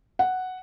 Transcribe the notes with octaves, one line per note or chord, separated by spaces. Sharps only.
F#5